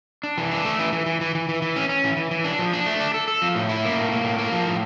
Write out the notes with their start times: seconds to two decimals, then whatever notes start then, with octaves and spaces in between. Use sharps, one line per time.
0.23 D4
0.38 E3
0.51 D4
0.65 A3
0.79 E3
0.93 E3
1.06 E3
1.21 E3
1.35 E3
1.49 E3
1.62 E3
1.76 C#4
1.89 C#4
2.04 E3
2.17 E3
2.31 E3
2.44 D4
2.59 F3
2.73 D4
2.86 A3
3.00 D4
3.14 A4
3.28 A4
3.42 F3
3.55 A2
3.69 E4
3.84 A#3
3.97 A2
4.11 A#3
4.24 A2
4.39 A#3
4.52 F3
4.67 A2